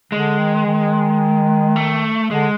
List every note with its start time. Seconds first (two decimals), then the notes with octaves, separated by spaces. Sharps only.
0.12 D3 G#3
0.39 D#3
0.67 D#3
1.76 A3
2.31 D3 G#3